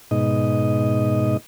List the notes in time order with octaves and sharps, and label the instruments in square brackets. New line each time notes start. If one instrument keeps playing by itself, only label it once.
[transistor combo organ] G#2 B2 D#4 D#5